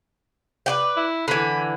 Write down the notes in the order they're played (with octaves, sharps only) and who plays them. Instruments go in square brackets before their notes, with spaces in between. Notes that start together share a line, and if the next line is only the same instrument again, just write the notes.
[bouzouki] B4 D5 G5
[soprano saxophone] E4
[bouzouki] D3 E3 [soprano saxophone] B5